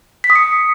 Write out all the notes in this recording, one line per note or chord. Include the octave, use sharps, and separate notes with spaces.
B6
D#6
C#7